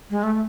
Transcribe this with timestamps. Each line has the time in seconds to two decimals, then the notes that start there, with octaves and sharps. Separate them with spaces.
0.10 G#3
0.23 A3
0.33 A3